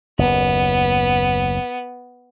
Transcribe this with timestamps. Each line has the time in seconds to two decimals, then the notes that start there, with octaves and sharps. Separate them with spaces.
0.19 F#1 D#2 B3